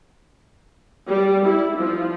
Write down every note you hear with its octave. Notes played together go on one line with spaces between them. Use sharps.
G3
E4
F3